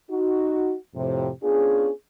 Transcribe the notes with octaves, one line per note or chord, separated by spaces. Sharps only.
D#4 F#4
F2 A2 C3
B3 C#4 D4 F4 G#4